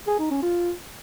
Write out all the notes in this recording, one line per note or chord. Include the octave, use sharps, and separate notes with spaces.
G#4
D#4
C#4
F4